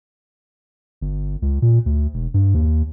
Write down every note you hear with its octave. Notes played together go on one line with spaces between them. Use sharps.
G1
C#2
A#2
D2
E1
G2
D#2